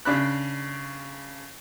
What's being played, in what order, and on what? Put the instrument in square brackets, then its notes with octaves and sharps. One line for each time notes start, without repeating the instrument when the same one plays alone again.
[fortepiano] C#3 D4 B5 F#6